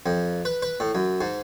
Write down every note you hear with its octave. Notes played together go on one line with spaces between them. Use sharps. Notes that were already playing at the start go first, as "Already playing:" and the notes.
F2
B4
B4
A2
F#2
G#2